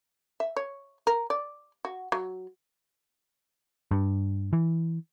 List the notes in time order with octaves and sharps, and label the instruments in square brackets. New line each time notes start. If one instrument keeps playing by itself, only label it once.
[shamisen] E5
C#5
A#4
D5
F#4
F#3
[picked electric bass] G2
E3